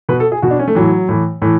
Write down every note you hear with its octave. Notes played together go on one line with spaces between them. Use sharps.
B2 B4
A4
G#4
B2 F#4
D4
C#4
A3
A2 E3 F#3
A2 E3
A2 E3